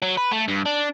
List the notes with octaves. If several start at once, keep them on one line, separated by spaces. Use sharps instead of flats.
F#3
B4
A3
G2
D4